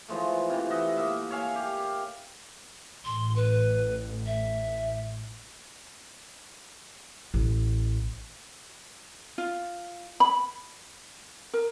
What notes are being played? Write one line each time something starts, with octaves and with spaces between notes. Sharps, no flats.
E3 F3 G#3 A3
C3 E3
D#5 E5 F#5
A#3 E5
C#5 E5 F5 G#5
G4
A1 C6
B4
E5
A1
F4
B5
A#4